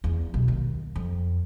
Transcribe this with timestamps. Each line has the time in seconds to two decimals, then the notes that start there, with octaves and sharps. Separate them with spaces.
0.04 E2
0.34 B1
0.48 D#2
0.96 F2